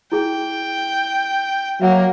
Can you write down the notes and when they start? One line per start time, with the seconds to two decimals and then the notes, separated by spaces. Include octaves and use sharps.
0.12 E4 G#4 G5 G#5
1.82 F#3 A#3 E5 F#5 G#5